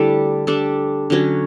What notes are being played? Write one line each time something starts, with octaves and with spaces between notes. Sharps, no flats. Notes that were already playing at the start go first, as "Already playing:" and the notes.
Already playing: D3 G3 A3 D4 E4 A4
G3 D4 A4
D3 F#3 C#4